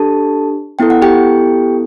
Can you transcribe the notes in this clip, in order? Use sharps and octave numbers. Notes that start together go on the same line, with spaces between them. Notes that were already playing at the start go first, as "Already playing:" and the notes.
Already playing: D4 G4 A4 A5
B3 E4 A4 G5
F#5
G4 G5